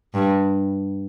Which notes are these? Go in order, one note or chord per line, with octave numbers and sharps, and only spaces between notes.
G2